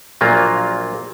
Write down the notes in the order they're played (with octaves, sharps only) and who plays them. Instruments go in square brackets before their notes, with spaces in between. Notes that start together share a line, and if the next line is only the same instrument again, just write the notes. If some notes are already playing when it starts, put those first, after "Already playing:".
[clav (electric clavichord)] A#1 A#2 F#3 A#3 F4